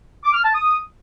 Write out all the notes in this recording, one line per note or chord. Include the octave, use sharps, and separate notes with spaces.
D6
F6
A5
D#6